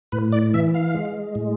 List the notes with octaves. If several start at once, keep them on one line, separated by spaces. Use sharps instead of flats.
A2 B4
D5
E3 E5
F5
G#3
A2